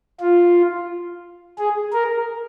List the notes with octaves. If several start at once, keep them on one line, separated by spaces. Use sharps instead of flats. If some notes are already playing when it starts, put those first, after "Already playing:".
F4
G#4
A#4